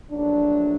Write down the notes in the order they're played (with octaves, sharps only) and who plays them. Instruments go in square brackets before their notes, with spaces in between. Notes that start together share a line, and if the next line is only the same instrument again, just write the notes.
[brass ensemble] A#1 A2 F#3 D4